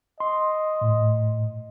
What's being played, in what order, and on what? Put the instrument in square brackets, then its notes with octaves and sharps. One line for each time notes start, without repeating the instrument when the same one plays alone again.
[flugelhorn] D#5 [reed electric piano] C6
[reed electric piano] A2